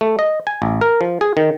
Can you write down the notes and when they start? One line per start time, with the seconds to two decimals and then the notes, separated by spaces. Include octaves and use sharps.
0.01 A3
0.19 D#5
0.47 G#5
0.62 A1
0.81 A#4
1.01 F3
1.21 G#4
1.37 D#3